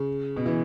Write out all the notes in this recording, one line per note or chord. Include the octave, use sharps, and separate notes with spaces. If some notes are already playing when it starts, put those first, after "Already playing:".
Already playing: C#3
B2
E3